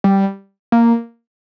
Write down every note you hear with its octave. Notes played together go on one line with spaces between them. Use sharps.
G3
A#3